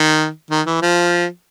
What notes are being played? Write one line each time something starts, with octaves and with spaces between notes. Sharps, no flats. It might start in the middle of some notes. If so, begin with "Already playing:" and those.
Already playing: D#3
D#3
E3
F3